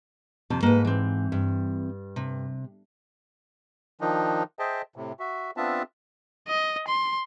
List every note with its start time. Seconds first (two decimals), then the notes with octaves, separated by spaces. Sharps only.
0.50 F2 C3 A5
0.63 G#2 A#3 B4
0.85 E3 C4
1.32 G2
2.16 C3
4.01 D#3 F3 D4 D#4
4.59 G#4 C5 D#5 E5 G5 A5
4.96 A2 C3
5.20 F#4 E5
5.57 B3 C4 D4 F4 E5 A5
6.48 D#5
6.88 C6